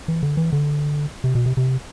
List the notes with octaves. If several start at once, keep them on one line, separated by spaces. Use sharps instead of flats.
E3
D3
E3
D3
C3
B2
C3
C3